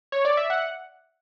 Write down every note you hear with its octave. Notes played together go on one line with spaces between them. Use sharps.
C#5
D5
E5
F#5